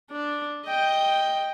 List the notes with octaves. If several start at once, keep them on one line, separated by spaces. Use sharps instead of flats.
D4
D#5 G5